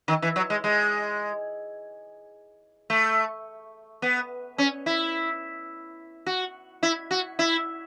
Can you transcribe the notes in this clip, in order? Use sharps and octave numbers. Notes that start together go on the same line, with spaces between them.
D#3
E3
F#3
G#3
G#3
A3
B3
C#4
E4
F#4
E4
F#4
E4